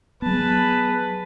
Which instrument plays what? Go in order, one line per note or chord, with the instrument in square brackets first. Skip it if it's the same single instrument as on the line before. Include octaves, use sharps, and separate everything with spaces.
[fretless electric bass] F#3 B3 [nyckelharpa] G#4 A5 [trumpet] B4